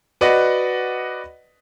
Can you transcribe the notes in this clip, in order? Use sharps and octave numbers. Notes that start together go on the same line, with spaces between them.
F#4 B4 D5 D#5 F#5